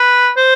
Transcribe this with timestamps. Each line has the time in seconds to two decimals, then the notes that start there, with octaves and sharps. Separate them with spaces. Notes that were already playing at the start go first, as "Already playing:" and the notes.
Already playing: B4
0.37 C5